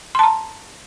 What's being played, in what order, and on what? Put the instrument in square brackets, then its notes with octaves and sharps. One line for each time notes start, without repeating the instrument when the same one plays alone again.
[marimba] C6
A5
A#5